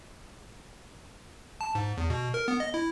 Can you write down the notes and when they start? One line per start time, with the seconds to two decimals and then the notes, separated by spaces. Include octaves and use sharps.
1.61 A5
1.75 G#2
1.98 E2
2.10 B2
2.34 A#4
2.48 B3
2.60 D#5
2.74 E4